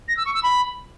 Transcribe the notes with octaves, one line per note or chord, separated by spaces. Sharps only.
A#6
E6
C#6
E6
B5